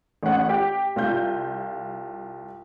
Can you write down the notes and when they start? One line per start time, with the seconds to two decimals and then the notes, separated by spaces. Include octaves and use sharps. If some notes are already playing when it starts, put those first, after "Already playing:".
0.23 A1 C#4 F#5
0.49 G4 G5
0.96 C2 F4 G6